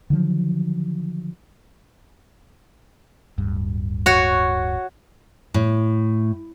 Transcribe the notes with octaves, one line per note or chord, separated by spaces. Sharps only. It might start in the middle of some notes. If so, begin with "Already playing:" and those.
D3 D#3 F3 F#3
D1 G2
F#4 C#5
A2